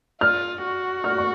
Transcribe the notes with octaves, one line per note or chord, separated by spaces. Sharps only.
F4 F6
F#4
F6
C#6